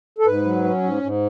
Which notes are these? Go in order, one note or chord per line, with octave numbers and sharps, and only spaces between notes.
A4
G#2 B4
F#3
C#4
G#2
G#2